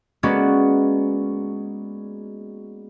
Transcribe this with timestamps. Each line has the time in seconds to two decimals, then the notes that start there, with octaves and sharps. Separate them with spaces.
0.23 G#3 A#3 B3 C#4 F#4 D5